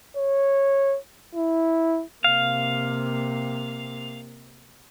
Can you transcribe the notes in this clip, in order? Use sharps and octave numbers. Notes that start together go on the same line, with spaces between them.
C#5
E4
C3 A#3 F5